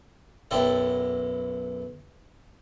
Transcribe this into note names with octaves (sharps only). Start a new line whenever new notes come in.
B1 F#2 E4 A4 D5 G5